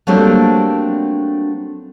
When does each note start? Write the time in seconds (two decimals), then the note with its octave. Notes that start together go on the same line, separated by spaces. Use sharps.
0.07 F#3 G3 A3 A#3 C4 D4